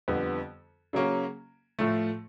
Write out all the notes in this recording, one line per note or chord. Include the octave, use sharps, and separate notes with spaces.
F2 D3 G3 B3
C#3 F#3 A#3 C#4
A2 F3 A3